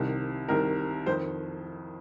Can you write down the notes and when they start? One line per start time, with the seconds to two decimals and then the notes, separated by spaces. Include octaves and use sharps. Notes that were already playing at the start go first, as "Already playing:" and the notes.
Already playing: C2 C3 D#3
0.48 C2 C3 D#3 A#4
1.06 F2 D#3 C5